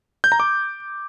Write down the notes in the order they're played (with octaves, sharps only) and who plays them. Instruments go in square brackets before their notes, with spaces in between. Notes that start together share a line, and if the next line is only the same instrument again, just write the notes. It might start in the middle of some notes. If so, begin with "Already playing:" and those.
[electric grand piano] G6
A#5
D6